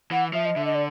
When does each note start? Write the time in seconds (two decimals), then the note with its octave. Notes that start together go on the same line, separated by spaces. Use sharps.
0.11 E3 F#5
0.33 F3 E5
0.45 D#5
0.56 D3 E5
0.65 D#5
0.74 D5